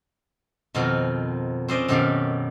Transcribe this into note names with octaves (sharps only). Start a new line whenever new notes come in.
F2 B2 D#3 C4 F4 A#5
C4 C#4 C5 D5 D#5
F#2 B2 D#3 G4 A4 F5